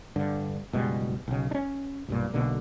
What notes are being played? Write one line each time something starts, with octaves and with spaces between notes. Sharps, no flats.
G2 D3
F#1 B2 G3 G#3
B1 C#3
C#4 D4
B1 G2 A#2
B1 B2 D3 A#3